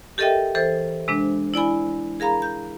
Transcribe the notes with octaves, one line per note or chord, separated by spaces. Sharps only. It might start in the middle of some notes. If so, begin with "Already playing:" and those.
G4 A4 A#4 D#5 E5 G5
E3 A4 C5
C3 G#3 D4
E4 D5 G#5 B5
G#4 A#4 F5 A#5 B5
G6